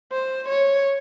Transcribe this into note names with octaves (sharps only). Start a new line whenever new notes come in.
C5
C#5